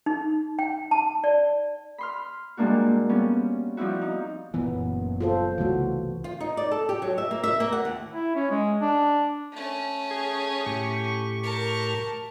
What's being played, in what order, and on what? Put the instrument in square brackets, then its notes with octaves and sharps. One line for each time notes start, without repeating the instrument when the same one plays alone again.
[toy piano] D#4
G5
A5
D5
[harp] B5 C6 F6
A#2 G3 G#3 A#3 D4 F#4
G3 B3 C#4
F3 G3 C4 E4 F#4
D#4
[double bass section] F#1 F#2 [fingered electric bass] A#2 E3 [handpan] B3
[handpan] F4 A4 C5
[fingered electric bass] C2 C#3 A3 [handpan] E3 F#4
[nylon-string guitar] F4
D#4
D5
A4
G4
F#3
E5
A#3
E5
A#3
F#5
D#2
[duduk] E4
C#4
G#3
D4
[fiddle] A3 C#4
[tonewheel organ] G#4 G#6
A2 G4 C#6
[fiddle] A#4 A5